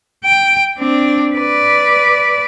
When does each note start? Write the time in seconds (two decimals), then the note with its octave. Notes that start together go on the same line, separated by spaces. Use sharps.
0.25 G5
0.78 C4 D4
1.35 B4 D5